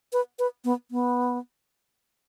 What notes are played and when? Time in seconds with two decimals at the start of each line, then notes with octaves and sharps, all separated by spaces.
0.13 B4
0.39 B4
0.64 B3
0.91 B3